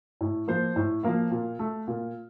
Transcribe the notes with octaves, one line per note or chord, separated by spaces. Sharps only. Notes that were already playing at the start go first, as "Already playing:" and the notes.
A2
F3 A#3 C5
A2
F3 A#3 F5
A#2
A3
A#2